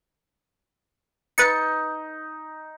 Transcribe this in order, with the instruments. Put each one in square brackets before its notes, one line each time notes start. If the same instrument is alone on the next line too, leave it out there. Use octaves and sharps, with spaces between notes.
[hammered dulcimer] D#4 [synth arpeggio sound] B4 A6 C#7